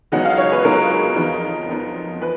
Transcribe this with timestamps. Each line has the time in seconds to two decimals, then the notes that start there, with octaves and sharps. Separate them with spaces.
0.12 C#2 C#3 F#3 B3 D#4 F#5
0.25 F5
0.38 C#5
0.52 B4
0.64 C#2 C#3 F#3 B3 D#4 A#4
1.16 F2 F3 B3 D#4
1.68 F2 F3 B3 D#4
2.21 F3 B4